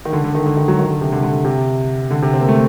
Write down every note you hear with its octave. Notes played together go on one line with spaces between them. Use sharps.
D#3
D3
D3
D#3
D3
D#3
F#3
D#3
D3
C3
D3
D3
C3
D3
C3
C4
A#3
A3